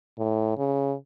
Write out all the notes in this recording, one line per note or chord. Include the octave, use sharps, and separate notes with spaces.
A2
C#3